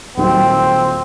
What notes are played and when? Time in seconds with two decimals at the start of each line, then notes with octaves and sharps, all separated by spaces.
0.18 D#1 D#3 F#3 C4